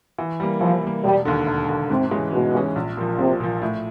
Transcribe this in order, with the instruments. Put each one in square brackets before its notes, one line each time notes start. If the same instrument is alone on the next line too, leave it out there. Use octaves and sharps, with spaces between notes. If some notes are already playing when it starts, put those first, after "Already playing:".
[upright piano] E3
G3 A#3
[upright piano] E3 [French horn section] F3
[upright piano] G3 A#3
[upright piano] E1 [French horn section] G3
[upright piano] D#2 D3
E1
D#2 D3
[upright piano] G#2 [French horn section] C3
[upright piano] E3 G#3 C#4
[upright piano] G#2 [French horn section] B2
[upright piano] E3 G#3 C#4
A#1
A#2 F3
[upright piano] A#1 [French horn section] C3
[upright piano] A#2 F3
A2